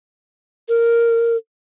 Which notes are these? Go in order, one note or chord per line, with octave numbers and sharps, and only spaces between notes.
A#4